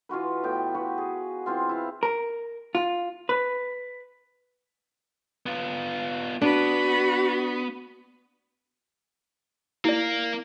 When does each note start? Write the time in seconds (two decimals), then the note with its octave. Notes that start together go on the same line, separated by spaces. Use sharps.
0.09 E3 F4 F#4 B4
0.43 A2 B3 G5
0.75 F#4 G4 B4
0.98 G#4
1.46 E3 C4 F4
1.69 E4 F5
2.03 A#4
2.75 F4
3.29 B4
5.46 B3 F4
6.42 B3 D4 F#4 B5
9.85 A#3 E4 D5